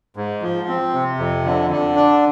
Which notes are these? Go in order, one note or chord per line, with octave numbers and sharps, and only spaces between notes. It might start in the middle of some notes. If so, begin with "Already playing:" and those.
G#2
F3
C4
C3
F2
D3
D3
D4